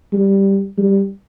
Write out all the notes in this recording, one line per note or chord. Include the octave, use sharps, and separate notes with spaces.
G3
G3